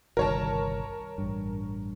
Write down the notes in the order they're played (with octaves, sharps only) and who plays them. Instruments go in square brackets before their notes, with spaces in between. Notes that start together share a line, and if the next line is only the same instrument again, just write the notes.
[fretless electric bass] G1 C2 D#3 [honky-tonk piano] A#4 C#5 A5
[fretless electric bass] A1 G2